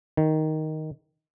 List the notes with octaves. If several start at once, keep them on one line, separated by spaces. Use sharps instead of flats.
D#3